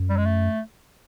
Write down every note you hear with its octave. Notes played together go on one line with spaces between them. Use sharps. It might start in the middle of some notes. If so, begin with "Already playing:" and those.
Already playing: F#2
G3
G#3
A3